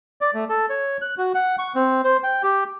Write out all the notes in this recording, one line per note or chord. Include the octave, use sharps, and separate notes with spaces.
D5
A3
A4
C#5
F#6
F#4
F#5
C#6
C4
C5
G5
G4